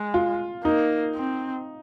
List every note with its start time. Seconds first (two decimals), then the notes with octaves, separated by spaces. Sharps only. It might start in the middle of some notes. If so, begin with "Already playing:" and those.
Already playing: G#3
0.14 F4
0.64 A#3 D#4
1.15 C4